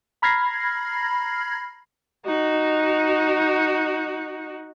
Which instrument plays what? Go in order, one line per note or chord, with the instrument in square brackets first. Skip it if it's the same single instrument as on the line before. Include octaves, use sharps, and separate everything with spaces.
[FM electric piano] A#5 B5 F6 G#6 A#6 C7
[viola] D#4 F#4